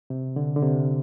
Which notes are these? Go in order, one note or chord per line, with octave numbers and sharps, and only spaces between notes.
C3
D3
D3
C3